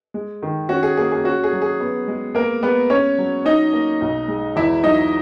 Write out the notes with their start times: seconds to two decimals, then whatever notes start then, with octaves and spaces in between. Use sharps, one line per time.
0.14 G#3
0.43 D#3
0.69 C#4 F#4
0.83 G#4
0.97 A#3 G#4
1.11 G#4
1.24 C#4 F#4
1.44 G#4
1.53 F#3
1.62 G#4
1.80 B3
2.08 G#3
2.35 A#3 B3 A#4
2.63 G#3 B3 B4
2.90 B3 C#4 C#5
3.18 F#3
3.45 C#4 D#4 D#5
3.73 A#3
4.01 B1
4.28 G#3
4.56 E2 E4 E5
4.83 F#3 D#4 D#5